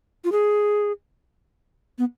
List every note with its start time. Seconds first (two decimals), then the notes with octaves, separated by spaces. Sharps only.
0.24 F4
0.32 G#4
1.98 B3